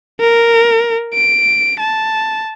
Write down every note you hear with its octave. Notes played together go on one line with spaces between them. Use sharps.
A#4
D7
A5